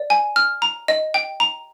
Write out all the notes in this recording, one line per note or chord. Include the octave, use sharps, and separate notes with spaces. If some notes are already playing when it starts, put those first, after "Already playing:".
Already playing: D5
G#5
F6
A#5
D#5
G5
A#5